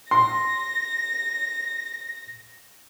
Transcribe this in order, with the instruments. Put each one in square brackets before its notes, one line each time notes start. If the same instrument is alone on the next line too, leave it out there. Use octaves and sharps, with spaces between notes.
[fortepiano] C6 [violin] A#6